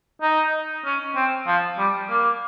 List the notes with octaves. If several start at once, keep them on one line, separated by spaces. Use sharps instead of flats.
D#4
C#4
C4
F3
G3
A#3